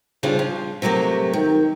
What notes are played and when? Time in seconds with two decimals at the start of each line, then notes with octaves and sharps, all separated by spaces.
0.23 C#3 G3 D4 F4 G#4 C5
0.39 F3
0.82 C3 F#3 A3 A#3 G4
1.33 D#3